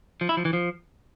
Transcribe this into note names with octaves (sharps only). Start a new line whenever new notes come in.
F3
E4
F3
E3
F3